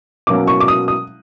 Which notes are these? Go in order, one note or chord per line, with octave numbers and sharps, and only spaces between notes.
B2 F#3 A#3 C#4 D6
C#6
D6
D#6
D#6